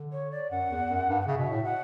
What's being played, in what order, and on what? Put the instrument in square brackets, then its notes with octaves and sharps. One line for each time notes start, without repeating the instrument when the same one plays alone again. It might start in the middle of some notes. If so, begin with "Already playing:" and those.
Already playing: [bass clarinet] D3
[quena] C#5
D5
[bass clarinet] F#2 [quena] F#5
[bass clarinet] E2
F#2
G2
[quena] F#5
[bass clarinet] C#3 [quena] E5
[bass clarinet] B2
A2
[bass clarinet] B2 [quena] F#5